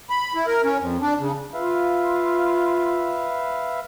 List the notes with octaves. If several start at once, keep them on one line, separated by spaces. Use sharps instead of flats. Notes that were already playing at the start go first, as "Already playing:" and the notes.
B5
E4
A#4
C#4
F2
D4
C#3
F4 B4 E5 F5